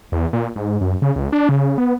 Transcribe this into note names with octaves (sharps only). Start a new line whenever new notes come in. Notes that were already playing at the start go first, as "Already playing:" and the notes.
E2
A#2
G#2
F#2
C#3
C#2
D4
C#3
B3